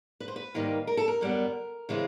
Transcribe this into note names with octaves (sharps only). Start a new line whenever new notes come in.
B4
C5
B4
G#2 D#3 G3 A#3
A#4
A4
A#4
F#2 D3 G3 B3
C#3 E3 G#3 C4